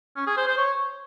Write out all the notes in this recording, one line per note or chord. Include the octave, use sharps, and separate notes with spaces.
C#4
G#4
C5
C5
C#5